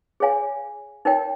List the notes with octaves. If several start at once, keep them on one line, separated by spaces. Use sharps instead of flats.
G#4 C#5 F5 G#5
D#4 A#4 C#5 G5